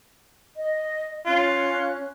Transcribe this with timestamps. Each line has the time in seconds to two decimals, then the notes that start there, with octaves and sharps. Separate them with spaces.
0.55 D#5
1.26 C#4 F4 F#6